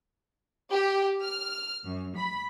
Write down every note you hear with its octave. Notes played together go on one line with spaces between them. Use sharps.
G4
F6
F#2
B5